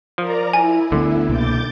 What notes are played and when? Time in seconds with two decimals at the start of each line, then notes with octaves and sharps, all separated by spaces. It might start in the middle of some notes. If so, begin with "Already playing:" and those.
0.18 F3 A#4 D5 A#5
0.53 E4 G#5
0.92 D2 D3 G3 B3
1.29 C2 B2 A#3 D6 G6 A6